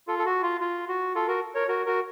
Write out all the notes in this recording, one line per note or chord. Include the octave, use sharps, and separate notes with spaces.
F4 A4
A4
F#4
F4
F4
F#4
F4 A4
F#4 A#4
A#4 C#5
F#4 A#4
F#4 A#4